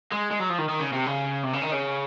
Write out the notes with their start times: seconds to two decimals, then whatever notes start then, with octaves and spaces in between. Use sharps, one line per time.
0.12 G#3
0.31 G#3
0.40 F#3
0.50 F3
0.58 D#3
0.69 D#3
0.80 C#3
0.93 C3
1.06 C#3
1.43 C3
1.53 C#3
1.62 D#3
1.72 C#3